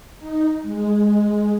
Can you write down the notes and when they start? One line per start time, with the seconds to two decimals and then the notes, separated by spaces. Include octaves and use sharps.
0.20 D#4
0.62 G#3